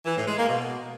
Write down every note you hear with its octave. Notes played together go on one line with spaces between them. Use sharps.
E3
A2
G#3
A#3
B2